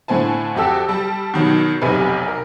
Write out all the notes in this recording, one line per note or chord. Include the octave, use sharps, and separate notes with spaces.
A2 D3 C4 G#5 A5
F2 F#4 G4 A4 E6
G3 A5
B2 D#3 F#3
F1 B1 C3 B4 G#5
A#4